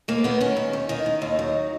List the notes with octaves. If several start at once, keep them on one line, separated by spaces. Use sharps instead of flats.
D#2 A#3
D#3 B3
D#3 C#4
D#2
D#2
D#3 D#4
D#3
D#2
F#3